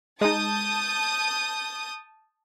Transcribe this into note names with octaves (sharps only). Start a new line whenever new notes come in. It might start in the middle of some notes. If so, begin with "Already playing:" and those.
G#3 D#4 A5 D#6 G6